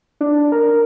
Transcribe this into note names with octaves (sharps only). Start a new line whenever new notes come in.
D4
A#4